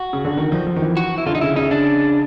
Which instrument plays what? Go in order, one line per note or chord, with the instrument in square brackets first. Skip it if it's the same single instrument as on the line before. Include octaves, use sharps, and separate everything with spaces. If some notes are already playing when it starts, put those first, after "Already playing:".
Already playing: [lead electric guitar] F#4
[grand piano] C#3
D3
D#3
F3
F3
D#3
E3
[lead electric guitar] F#4
E4
[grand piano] D3 [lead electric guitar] F4
[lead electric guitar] D#4
[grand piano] C#3 [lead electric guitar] E4
[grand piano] C#3 [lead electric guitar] D#4
[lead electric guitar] D4